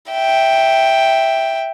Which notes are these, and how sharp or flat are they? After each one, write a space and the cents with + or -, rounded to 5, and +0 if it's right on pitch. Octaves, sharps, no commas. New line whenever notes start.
E5 +0 G5 +0